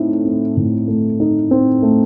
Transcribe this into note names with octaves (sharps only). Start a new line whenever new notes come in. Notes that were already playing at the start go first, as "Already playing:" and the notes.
Already playing: A2 A3 C4 D#4
C4
A2
A3
D#4
C4
A3